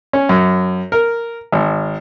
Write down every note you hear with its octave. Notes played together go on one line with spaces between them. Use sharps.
C#4
F#2
A#4
G#1